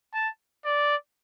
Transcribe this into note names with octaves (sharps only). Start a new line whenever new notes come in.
A5
D5